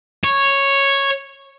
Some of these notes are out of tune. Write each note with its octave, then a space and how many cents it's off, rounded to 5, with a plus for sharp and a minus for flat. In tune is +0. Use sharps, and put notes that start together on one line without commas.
C#5 -5